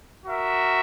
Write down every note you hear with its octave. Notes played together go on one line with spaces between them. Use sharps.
F#4 A#4 E5